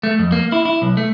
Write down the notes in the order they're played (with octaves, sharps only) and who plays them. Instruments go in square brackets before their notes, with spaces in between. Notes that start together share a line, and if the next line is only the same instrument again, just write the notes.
[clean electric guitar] A3
F2
A#3
E4
E4
B1
A3